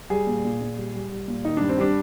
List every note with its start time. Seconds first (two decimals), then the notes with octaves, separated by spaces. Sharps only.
0.10 G3 G#4
0.27 A#2
0.45 A#2
0.61 A#2
0.77 G3
0.95 G3
1.11 G3
1.28 A#2
1.45 D#3 D#4
1.57 G2 D4
1.69 C4
1.78 G3 D4